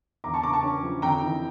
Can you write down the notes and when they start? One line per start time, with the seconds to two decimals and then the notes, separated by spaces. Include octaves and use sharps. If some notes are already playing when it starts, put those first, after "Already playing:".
0.24 E2 A#5 D6
0.34 A5 C#6
0.43 C#3 A#5 D6
0.53 A5 C#6
0.63 C#4
0.83 F3
1.02 F2 G5 A#5
1.22 E3